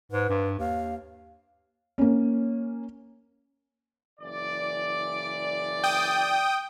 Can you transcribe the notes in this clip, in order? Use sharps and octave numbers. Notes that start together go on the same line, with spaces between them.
G#2 B4
G2
D#2 F5
A#3 C#4
F#1 E3 D5
G5 D#6